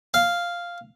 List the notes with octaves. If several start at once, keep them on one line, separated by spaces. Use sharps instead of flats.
F5